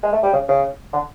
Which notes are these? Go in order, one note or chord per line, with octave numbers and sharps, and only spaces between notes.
G#3
A3
G3
C#3
C#3
D3